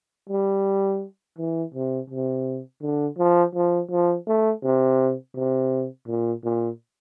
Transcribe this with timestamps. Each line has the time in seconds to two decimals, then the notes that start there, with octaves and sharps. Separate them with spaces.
0.29 G3
1.38 E3
1.74 C3
2.10 C3
2.82 D3
3.18 F3
3.55 F3
3.91 F3
4.27 A3
4.64 C3
5.36 C3
6.08 A#2
6.44 A#2